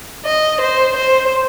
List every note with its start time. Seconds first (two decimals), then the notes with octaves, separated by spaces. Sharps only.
0.25 D#5
0.61 C5
0.97 C5